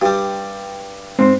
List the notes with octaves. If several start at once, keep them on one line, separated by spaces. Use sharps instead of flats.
G2 G3 G4
G#2 C4